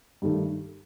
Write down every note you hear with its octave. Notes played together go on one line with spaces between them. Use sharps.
G2 D#3 A3